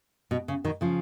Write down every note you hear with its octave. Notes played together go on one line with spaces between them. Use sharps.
B2
C#3
B2 D#3
C#3 F3